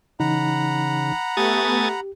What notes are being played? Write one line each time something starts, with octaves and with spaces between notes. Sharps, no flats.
C#3 E3 D#4 F#5 A#5 B5
A3 B3 G4 G#5 D#6 A6